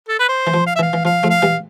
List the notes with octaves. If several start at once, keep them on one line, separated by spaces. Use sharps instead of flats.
A4
B4
C5
E3
F3
F5
E5
E3 F5
E3
F3 F5
F3 A3
F5
E3 G3